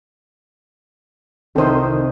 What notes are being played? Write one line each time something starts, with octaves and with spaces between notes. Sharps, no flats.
C2 D#3 C4 A4 C5 D#6